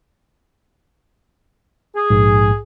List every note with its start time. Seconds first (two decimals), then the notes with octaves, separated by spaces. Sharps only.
1.96 G#4
2.10 A#1 G#2